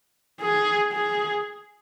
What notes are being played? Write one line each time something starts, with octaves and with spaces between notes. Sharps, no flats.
G#4
G#4